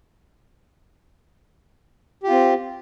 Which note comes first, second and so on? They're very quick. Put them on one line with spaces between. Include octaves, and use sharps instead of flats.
G4 F4 C4